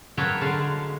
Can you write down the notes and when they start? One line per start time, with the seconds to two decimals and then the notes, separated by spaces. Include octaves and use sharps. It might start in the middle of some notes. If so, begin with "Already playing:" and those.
0.17 F#3 A#3 B4 C#5 G5 A5
0.41 D3 G#3 F5 A5